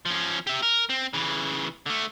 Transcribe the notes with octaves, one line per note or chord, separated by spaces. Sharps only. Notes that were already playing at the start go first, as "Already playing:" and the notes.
F3 C#4
G4 E5
A#4
C4
C#3 E3
D3 A3